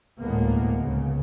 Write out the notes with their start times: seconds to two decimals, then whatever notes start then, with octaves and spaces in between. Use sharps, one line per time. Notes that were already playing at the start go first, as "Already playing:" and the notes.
0.20 A1 D2 A2 G#3 A#3 B3
0.79 C#2 C#3